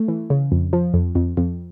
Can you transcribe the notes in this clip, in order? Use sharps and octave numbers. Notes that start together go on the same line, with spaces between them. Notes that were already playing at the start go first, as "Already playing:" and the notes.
Already playing: A3
E3
C#3
F2
F3
F2
F2
F2